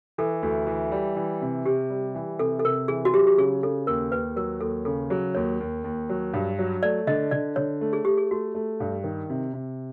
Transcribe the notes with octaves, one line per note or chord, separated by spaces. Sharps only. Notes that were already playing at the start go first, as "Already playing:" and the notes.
E3 A4
D2
E3
G3
E3
C3
C3 G4
G3
E3
C3 A4
A4
C3 A#4
E3 G#4
F#4
F#3 G4
G4
C#3 G#4
C#3 A4
D#2 A#4
D#2 B4
F#3 A#4
D#2 A4
C#3 A4
F#3 G#4
D#2 C#5
D#2
D#2
F#3
G2
F#3
A3 D5
D3 D#5
D3 D5
D3 C#5
A3
G#4
A3 G4
G#4
A3 F#4
A3
G2
D#3
C3
C3